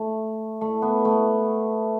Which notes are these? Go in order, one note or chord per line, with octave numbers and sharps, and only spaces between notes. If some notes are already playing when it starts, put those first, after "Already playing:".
Already playing: A3
A3
B3
A3